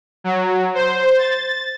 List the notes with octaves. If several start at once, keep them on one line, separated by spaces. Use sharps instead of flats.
F#3
C5
A6